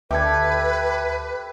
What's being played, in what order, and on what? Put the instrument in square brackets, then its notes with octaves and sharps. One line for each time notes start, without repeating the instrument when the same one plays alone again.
[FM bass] D2 [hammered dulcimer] G4 A4 [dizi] B4 [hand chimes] E5 G#6